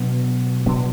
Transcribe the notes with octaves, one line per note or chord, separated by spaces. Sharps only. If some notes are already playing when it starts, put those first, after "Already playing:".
Already playing: B2 F#3 B3 D4
B2 F#3 B3 D4